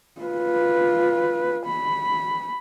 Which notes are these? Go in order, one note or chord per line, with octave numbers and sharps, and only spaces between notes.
F4 B4
B5